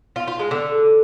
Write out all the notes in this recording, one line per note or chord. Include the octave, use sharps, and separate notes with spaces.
F4
F4
G#3
D3